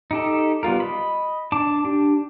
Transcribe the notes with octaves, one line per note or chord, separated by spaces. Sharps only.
D#4 G4 A4
G3 B3 F4 A#4
D#5 B5
D4 A5 D6
D4 G4